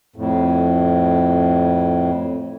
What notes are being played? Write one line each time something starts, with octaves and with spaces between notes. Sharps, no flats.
F2 A2